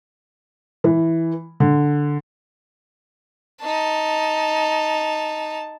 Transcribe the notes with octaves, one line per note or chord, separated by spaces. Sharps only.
E3
D3
D#4 A5